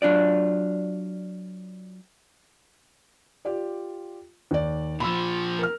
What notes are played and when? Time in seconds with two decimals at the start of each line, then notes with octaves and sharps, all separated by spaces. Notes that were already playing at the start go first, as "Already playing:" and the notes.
0.02 F#3 D4 F4 D5
3.45 F4 G4 D5
4.51 D#2 D5
5.00 A#2 F3 B5 E6
5.59 A#4 F6